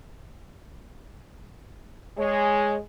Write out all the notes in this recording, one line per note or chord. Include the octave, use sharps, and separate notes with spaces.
G#3 C#5